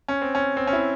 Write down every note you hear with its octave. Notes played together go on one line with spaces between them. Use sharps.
C#4
C4
C#4
C4
C#4
E4